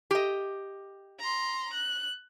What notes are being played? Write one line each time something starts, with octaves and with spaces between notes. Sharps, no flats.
G4 D#5
A#5 C6
F#6